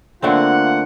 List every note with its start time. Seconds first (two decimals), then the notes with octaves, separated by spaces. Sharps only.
0.23 D3 A3 A#3 C4 F4 F#5